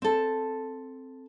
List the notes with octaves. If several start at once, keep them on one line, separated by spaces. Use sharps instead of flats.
C4 A4